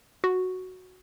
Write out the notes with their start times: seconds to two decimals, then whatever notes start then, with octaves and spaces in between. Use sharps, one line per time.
0.24 F#4